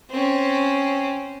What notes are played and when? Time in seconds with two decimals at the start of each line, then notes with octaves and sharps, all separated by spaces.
0.10 C4 C#4